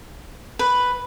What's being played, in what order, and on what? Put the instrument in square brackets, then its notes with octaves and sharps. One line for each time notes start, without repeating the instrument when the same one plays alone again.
[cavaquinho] B4